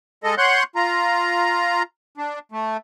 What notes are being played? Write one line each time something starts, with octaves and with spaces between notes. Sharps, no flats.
G#3 A4 D#5
C#5 F#5 C6 F#6 G6
F4 A#5
D4
A3